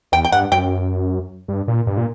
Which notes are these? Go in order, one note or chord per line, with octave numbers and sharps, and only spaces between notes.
E2 G5
G5
G2 F#5
F#2 G5
G2
A#2
G2
A#2